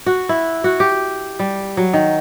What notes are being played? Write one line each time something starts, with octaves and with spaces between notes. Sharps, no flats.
F#4
E4
F#4
G4
G3
F#3
D#3